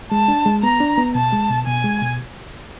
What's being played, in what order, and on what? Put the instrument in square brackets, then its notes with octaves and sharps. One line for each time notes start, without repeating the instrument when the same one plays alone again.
[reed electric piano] G#3 [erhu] A5
[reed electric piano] D4
G#3
[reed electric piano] B3 [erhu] A#5
[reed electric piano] D4
B3
[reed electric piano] B2 [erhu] A5
[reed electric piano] G#3
B2
[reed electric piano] B2 [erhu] G#5
[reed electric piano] G#3
B2